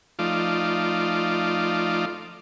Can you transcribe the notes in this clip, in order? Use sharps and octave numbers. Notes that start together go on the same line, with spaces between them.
F3 A3 D#4 F4 D5